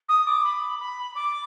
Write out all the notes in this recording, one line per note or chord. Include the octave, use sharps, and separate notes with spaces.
D#6
D6
B5
B5
D6